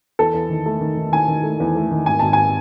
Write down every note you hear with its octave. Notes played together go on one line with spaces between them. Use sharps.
E2 A4
E2
D#3
A3
D#3
D#3
D#3 G#5
D#3
A3
E2
A3
D#3
G#1 G#5
G#1 A5
G#5